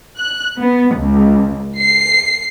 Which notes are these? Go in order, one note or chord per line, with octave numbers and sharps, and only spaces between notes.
F#6
B3
C#2
C7